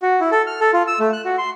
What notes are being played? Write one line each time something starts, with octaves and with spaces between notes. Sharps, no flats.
F#4
E4
A4
F6
A4
F4
E6
A3
F#6
F#4
C6